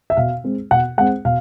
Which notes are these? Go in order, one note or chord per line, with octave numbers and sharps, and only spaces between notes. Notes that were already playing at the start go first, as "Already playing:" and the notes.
E5
B2 F5
G#3 C4
B2 F#5
G#3 C4 F#5
B2 F5